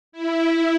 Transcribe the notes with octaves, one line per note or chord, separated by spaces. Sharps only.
E4